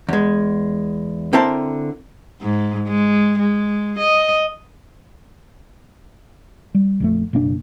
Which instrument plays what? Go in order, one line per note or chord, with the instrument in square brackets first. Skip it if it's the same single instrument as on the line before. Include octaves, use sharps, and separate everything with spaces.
[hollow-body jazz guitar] E2 G#3
D3 C4 E4 A#4 C5 A5
[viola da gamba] G#2
G#3
G#3
D#5
[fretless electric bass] G3
A#1 F2 A3
F#1 B2 A#3 D4